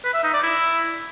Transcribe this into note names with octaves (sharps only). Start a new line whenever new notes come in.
B4
E5
D#4
D5
E4